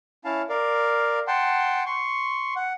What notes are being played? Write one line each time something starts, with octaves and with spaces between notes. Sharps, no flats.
C#4 E4 F5 A5
A#4 D5 F5
F#5 G5 A5 C6
C6 C#6
F#5